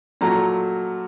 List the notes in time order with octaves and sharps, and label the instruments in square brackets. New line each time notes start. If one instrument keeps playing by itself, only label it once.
[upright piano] A#2 F#3 A3 A#5